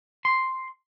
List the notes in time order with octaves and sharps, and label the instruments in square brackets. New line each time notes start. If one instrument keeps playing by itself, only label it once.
[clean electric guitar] C6